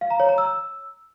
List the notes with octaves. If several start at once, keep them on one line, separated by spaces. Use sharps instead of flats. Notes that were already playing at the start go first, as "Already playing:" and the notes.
F5
A#5
C#5
A#5
E6